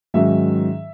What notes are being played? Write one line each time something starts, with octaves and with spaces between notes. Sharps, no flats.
G#2 D#3 F#3 C#4 E5